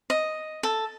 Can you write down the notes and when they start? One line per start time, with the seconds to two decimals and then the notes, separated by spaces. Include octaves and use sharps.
0.10 D#5
0.63 A4